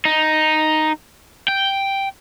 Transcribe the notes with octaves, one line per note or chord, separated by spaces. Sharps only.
D#4
G5